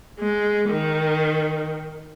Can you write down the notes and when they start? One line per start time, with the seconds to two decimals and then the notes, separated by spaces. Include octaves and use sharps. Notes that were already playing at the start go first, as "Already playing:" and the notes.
0.19 G#3
0.70 D#3